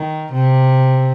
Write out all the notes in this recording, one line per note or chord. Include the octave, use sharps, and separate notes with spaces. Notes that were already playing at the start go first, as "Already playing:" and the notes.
Already playing: D#3
C3